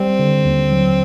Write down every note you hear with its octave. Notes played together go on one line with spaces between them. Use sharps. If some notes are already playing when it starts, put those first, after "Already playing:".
Already playing: G3 C4
D3
D#2
F#3